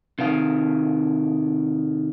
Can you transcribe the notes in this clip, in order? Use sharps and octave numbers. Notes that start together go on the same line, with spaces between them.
C3 D#3 F5